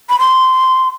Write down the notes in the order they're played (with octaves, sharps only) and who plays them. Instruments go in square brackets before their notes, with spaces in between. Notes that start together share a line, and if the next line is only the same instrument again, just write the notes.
[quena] B5
C6